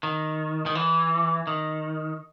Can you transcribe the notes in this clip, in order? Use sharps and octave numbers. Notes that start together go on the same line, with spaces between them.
D#3
D#3
E3
D#3